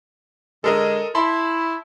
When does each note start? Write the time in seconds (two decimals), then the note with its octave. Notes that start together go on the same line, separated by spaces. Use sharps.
0.64 D3 G#3 A4 A#4 D#5
1.15 E4 A5 B5 C6